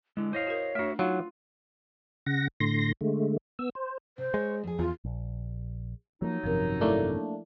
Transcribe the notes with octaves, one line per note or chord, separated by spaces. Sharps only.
D3 G#3 E4
E4 C5 C#5 D#5 F5
F#4 A#4
A3 D4 F#4 E5
F#3 D#4 F4 F5
C#3 F#5 A#6
A2 D3 C6 A#6
D3 G#3 A3
B3 E6
C5
C3 C5
G#3 C#5
F2 G#4
E2 F4
A#1
F3 F#3 A3 A#3 D#4
G#1 F#2 C3 F3 A#4
A3 A#3 D4 E4